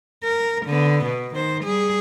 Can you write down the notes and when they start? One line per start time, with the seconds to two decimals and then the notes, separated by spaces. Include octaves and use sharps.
0.24 A#4
0.66 D3 B3
1.05 B2
1.35 D#3 C5
1.64 G3 G#4